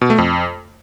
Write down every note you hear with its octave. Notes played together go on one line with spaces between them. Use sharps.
B2
A3
F2